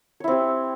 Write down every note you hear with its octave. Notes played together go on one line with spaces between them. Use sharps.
C4 E4 G4 C#5